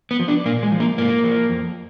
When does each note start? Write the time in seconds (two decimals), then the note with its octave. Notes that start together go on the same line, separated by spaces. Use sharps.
0.11 B3
0.19 F3
0.28 D4
0.46 A#2 A#3
0.63 G#3
0.72 F3
0.80 A#3
0.98 G#2 A#3
1.24 F3
1.49 F2